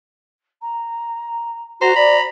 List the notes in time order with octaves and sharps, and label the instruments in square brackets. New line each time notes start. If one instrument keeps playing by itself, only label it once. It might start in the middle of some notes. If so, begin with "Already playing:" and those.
[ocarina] A#5
[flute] F#4 [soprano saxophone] C5 [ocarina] F#5 [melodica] A#5
[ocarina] C5 [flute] D5 [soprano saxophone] B5